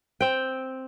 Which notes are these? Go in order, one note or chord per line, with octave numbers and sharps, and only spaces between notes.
C4 G5